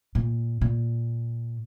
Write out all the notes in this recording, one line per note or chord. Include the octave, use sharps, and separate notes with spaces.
A#2
A#2